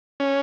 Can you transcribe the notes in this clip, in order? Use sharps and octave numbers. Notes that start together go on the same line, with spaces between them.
C#4